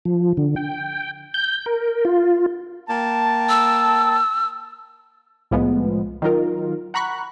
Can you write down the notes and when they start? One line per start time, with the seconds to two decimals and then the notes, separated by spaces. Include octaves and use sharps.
0.05 F3
0.37 D3
0.56 G5
1.34 G6
1.66 A#4
2.05 F4
2.89 A#3 G5 A5
3.49 E6
5.51 C2 A2 F3 G#3 B3
6.22 D#3 F#3 D#4 F4 A#4
6.94 F#5 A#5 B5 C#6 F#6